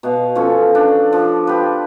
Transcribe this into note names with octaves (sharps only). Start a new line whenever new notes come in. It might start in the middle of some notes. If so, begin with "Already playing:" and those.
B2 F5
F3 C#4 F4 A4
D4
F3
F4 G4 B4